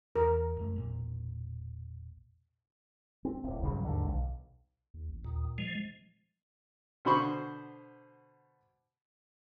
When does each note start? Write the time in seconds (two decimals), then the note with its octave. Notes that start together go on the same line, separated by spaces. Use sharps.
0.16 E2 A#4
0.57 F#1 F#2 A3
0.76 E1 A#1 A#2
3.25 C4
3.44 D1 G1
3.63 A#1 G2 C#3 F#3
3.84 D#2 G#2 D3
4.04 B1
4.94 D#2
5.09 A1
5.25 D#2 A#2
5.58 F3 G#3
7.05 B2 D3 C5 B5 C#6